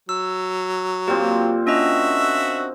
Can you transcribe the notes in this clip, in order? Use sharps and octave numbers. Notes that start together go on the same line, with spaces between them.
F#3 E6
A#2 C4 G4
C#4 D4 F#4 D#5 E5